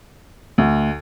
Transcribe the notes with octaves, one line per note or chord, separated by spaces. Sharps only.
D2